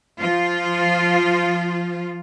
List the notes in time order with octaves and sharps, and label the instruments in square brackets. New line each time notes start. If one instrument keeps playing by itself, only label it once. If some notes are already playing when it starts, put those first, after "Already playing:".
[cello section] F3 F4